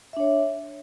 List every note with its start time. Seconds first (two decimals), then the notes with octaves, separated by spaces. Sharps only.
0.13 E5
0.17 D4
0.20 C#5